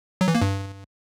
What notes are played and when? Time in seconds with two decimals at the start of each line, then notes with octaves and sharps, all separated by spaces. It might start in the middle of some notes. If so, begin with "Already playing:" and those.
0.21 F#3
0.28 E3
0.35 A#3
0.41 G2